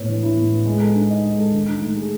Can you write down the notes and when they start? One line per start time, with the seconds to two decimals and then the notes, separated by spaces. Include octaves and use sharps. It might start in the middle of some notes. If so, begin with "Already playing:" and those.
Already playing: A2 B3 C#5
0.09 E3
0.23 E4
0.38 A2
0.52 B3
0.66 G#3
0.80 A4
0.95 D#4
1.11 D#5
1.25 G#3
1.39 A4
1.53 D#3
1.68 D#4
1.82 A3
1.96 G#4